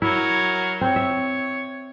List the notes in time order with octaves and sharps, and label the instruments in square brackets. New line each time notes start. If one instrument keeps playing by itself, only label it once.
[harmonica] F#3 A#4 C#5 [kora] E4
[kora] C4 [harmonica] C#5
[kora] E5